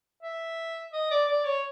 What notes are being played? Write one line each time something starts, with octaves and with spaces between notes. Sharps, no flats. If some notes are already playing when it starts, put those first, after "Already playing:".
E5
D#5
D5
D5
C#5